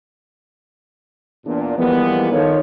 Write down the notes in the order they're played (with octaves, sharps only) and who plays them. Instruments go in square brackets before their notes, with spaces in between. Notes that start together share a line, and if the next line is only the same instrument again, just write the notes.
[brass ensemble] E2 A#2 D4
E3 F3 G3 G#3 A#3 B3
D#3 F3 A4 C#5